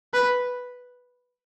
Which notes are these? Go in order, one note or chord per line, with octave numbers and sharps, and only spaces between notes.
B4